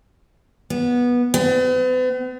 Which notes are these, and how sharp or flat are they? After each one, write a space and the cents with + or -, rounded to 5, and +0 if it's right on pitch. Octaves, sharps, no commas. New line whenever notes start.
B3 -15
B3 +45